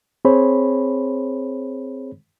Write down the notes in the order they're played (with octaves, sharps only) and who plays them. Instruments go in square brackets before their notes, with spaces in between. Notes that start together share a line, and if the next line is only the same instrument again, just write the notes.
[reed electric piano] C4 G#4 C5 C#5 B5